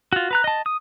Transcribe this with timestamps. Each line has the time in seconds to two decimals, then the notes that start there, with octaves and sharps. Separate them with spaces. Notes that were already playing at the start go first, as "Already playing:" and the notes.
0.13 F4 F#4
0.31 B4 A#5 F#6
0.44 D#5 A5
0.66 D#6